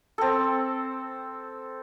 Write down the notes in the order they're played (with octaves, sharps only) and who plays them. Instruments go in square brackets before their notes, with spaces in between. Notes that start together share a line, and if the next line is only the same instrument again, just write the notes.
[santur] C4 A4